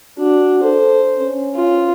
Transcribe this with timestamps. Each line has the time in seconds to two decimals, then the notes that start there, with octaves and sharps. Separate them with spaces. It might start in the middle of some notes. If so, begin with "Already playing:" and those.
0.19 D4 F#4
0.63 A4 C5
1.19 C#4
1.55 F4